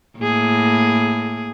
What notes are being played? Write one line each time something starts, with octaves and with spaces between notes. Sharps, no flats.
A2 A#3 G#4